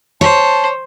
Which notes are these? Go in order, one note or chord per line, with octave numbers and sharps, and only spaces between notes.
C5 C#5 A5